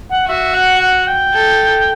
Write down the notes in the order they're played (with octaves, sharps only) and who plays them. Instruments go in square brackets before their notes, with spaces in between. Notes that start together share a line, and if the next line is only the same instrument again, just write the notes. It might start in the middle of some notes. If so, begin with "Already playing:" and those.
[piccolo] F#5
[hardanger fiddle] F#4 [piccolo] E5
[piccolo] F#5
F#5
G5
[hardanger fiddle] A4